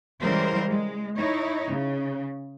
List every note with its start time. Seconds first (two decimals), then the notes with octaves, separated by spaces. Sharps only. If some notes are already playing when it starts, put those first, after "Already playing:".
0.21 C#3 E3 G3 G#3 A#4 C5
0.70 G#3
1.18 D#4 E4 C#5
1.68 C#3